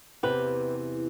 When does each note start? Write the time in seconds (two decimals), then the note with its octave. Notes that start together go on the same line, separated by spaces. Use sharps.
0.23 E2 C3 E3 G4 B4